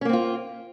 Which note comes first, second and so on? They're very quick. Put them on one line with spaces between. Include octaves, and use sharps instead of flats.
C#4 A#3 C4 F4